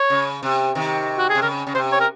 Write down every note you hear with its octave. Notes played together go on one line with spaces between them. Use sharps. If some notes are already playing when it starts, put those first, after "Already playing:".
Already playing: C#5
C#3
C3
C3 D#3
F#4
G#4
C3
C#3 A#4
C#3
C3 C5
C#5
A#4